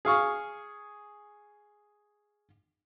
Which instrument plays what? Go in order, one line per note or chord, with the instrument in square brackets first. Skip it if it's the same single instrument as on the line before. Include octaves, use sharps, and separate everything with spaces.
[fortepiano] G#4 F5 C#6